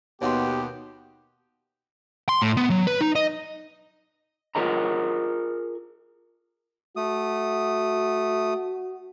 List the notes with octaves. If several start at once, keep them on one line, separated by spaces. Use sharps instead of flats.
D#2 B2 B3 G4 C#5 F#5 C6
C6
A2
B3
F#3
B4
D#4
D#5
F4 G#4 A#4 D#5 A#5
A3 F#4 D#6